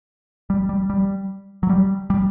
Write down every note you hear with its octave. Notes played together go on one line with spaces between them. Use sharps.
G3
G3
G3
F#3
G3
G3